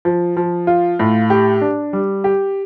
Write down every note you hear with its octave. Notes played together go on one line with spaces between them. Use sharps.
F3
F3
F4
A2
G4
D4
G3
G4